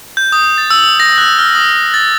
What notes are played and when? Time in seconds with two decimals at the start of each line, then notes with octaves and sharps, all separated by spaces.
0.17 G6
0.32 D#6
0.58 A6
0.71 E6
1.00 A#6
1.18 F#6
1.38 F6
1.55 D#6
1.94 A6